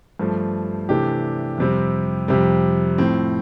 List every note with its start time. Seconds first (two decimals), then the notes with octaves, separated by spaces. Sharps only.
0.19 G2 F3 A3
0.89 C3 E3 A3 D4 G4
1.58 F2 C3 G3 C4
2.28 F2 C3 G3
2.98 A2 F3 C4